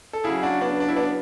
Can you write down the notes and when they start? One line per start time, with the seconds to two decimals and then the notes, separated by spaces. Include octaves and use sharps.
0.13 A4
0.24 C#3 F#3 E4 G#4
0.43 D4 F#4
0.61 B3 D4
0.80 D4
0.89 E4
0.96 B3 D4